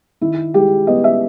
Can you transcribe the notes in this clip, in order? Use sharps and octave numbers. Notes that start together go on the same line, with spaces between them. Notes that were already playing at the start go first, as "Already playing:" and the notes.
D#3 E4
G#3 G4
B3 D#5
E5